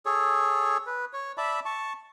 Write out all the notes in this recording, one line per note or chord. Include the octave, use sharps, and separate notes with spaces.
G#4 A4 C#5
B4
C#5
D5 E5 A5 B5
A5 C#6